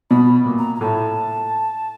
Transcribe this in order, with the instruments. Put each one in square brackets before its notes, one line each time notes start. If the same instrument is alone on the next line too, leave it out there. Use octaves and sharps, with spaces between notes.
[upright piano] B2 [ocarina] B5
[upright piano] A#2
[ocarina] A#5
A#5
[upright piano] A2 [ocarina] A5